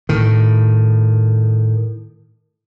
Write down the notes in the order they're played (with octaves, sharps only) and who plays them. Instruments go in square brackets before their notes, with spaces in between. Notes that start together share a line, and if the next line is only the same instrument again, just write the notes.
[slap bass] A2 D#3